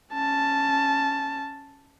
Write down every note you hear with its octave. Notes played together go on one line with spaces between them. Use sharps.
C#4 A5